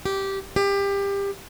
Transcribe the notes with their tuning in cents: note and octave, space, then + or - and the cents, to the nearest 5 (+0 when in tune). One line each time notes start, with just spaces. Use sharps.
G4 -10
G4 +25